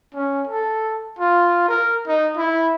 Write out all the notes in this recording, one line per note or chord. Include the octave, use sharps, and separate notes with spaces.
C#4
A4
F4
A#4
D#4
E4